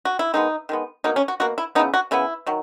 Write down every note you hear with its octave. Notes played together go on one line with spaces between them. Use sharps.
F#4
E4
D#3 G#3 B3 D#4
D#3 G#3 B3
B2 A#3 D#4
C#4
F#4
B2 A#3 F#4
E4
C#3 E3 B3 D#4
F#4
C#3 E3 B3 E4
D#3 F#3